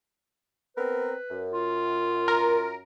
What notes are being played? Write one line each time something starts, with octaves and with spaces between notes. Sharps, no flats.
B3 C4 A#4 B4
F#2
F4
A#4